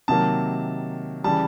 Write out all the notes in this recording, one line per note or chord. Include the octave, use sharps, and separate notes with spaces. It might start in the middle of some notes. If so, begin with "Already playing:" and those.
C3 D#3 F#3 A#3 A5
C#3 E3 G3 A5